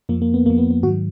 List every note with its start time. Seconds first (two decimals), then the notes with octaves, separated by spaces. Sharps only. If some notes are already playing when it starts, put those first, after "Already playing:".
0.09 F2 F3 A#3
0.22 A#3
0.34 B3
0.46 F2 A#3
0.50 F3
0.58 B3
0.71 B3
0.83 G#2 D#3 F#3 F#4